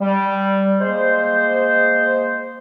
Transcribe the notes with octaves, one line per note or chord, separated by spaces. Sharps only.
G3
G#3 A#3 C5